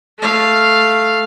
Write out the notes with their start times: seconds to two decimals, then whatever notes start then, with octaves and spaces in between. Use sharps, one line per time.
0.19 A3 F5